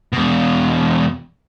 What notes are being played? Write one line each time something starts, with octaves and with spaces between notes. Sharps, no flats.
E2 B2